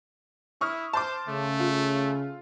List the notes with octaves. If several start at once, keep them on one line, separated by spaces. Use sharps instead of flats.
E4 C#6 D#6 F6
C5 A5 C6 D6
C#3 A3
F4